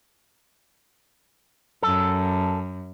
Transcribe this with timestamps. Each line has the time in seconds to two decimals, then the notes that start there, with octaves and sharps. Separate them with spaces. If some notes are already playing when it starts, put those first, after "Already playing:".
1.83 F#2 A4